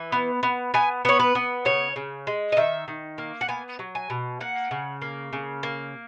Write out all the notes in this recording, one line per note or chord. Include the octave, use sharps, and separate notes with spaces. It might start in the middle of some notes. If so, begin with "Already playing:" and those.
Already playing: E3
B3
B3
B3 G#5
B3 C#5
B4
B3
C#3 C#5
C#3
G#3
D#5
D#3 E5
D#3
A#3
F#5
B3 G#5
F#3
G#5
B2
A#3 F#5
C#3
A#3
C#3
A#3